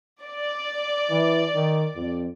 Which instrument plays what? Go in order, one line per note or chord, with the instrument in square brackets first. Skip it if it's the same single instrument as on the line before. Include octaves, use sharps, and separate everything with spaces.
[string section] D5
[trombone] E3
D#3
F2